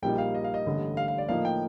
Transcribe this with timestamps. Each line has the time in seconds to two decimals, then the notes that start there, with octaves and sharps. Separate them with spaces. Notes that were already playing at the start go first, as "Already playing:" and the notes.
0.02 A#1 A#2 G3 A#3 D#4 G5
0.18 F5
0.34 D#5
0.44 F5
0.54 D#5
0.66 A1 G2 D3
0.97 F5
1.08 F5
1.18 D5
1.29 A2 F3 A#3 D#4 F5
1.45 G5